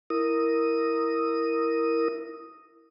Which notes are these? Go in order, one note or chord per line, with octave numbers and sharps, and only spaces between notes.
E4 A#4 D#6